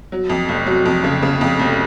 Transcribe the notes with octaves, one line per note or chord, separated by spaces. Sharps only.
F#3
F2
F1
F#3
F2
C#3
C#3
F2
F1